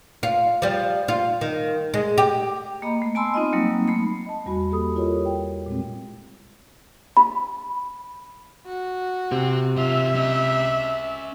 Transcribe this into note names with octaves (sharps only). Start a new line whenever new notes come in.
F4
F3 G3
F4
D#3
G#3
G4
A#3 D#5 A#5 B5
A3
B3 G#5 A5 B5 C6 E6
C4 D#4 F4 D#5
F#3 G3 A#3 C4 D#4
A3 A#3 B5
D#5 A5
E2 G3 F#4 B5
A#3 G4 A4 B5 D#6
E4 F4 G4 A#4 C#5 D#5
G5
A#2 G#3 C4
B5
F#4
C3 C4
B1 F4 E5
C#4 D#5